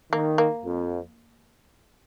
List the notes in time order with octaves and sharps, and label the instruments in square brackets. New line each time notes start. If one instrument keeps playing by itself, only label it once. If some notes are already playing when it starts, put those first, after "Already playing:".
[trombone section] D#3 [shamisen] A#3
[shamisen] A#3
[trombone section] F2